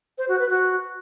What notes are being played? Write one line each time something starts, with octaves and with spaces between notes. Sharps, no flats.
C5
F#4
B4
F#4